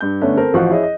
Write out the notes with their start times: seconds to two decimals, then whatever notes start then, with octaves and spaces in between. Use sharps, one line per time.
0.01 G2 G6
0.21 D3 A3 B3 C#4 D4
0.37 C4 A4 A#4 C5
0.54 A1 F3 F#4 F5 C#6 F#6
0.70 E4 G#4 C#5 D#5
0.83 D#5